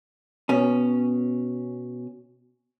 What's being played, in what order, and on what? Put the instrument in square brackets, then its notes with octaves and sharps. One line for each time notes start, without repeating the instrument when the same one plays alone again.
[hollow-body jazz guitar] B2 C#4